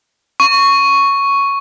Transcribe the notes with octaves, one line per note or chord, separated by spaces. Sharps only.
C#6